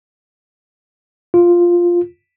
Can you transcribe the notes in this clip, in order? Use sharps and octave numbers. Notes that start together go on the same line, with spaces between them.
F4